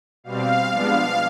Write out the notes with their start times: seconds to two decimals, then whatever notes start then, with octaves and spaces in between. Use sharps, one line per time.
0.24 B2 G3 C4 F5
0.70 F3 G#3 B3 D4 F5